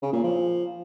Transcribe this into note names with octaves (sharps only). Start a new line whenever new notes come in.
C#3
A#2
F3